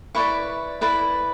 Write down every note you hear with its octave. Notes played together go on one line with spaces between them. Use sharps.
E4 B4 D5 C#6
E4 B4 D5